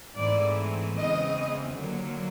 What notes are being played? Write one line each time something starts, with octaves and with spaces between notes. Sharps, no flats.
G#2 E3 A3 C4 D5
E2 C#3 E3 G#3 C4 D#5
D#2 D3 F#3 A#3